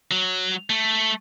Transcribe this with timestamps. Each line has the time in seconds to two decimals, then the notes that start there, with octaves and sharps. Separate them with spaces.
0.11 F#3
0.70 A3